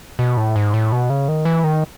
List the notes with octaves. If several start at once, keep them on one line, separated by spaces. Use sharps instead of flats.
B2
A2
G#2
A2
B2
C#3
D#3
E3
D#3